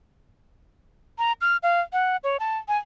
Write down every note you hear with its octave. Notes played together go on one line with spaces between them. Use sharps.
A#5
F6
F5
F#5
C#5
A5
G#5